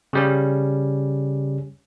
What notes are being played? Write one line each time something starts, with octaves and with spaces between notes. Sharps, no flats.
C#3 G3 C#4